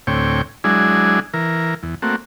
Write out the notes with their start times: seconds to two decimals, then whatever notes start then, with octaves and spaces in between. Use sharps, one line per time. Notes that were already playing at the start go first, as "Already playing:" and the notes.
0.07 D2 A2 C4 C#5 G5
0.64 F#3 G#3 D4 E4 G#4
1.34 E3 A#4
1.83 E2
2.02 A3 A#3 C4 F#4